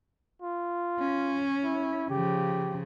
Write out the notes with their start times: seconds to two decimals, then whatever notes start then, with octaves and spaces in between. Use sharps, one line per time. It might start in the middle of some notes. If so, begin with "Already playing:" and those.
0.42 F4
1.00 C#4
1.63 E4
2.10 C#3 F3 G4